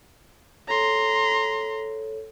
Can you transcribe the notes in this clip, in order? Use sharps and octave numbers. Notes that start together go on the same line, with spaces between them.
A4 C#5 A#5 C6